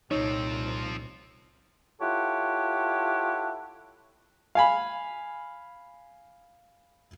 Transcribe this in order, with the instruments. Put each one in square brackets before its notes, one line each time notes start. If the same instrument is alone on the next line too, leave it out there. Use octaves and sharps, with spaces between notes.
[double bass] C2 A#2 [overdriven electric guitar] F3 C4 [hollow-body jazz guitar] D#4 C#5
[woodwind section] E4 F4 G4 A4 C#5 F#5
[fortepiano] F5 G#5 B5